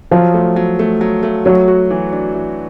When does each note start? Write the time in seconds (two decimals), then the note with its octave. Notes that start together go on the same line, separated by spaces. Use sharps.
0.11 F3 F#3
0.34 A3
0.56 F#3
0.79 A3
1.01 F#3
1.23 A3
1.45 F#3 A3
1.68 F#4
1.90 E3
2.12 D4
2.35 E3